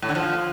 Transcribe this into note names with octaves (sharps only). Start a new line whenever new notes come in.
A2
D3
F3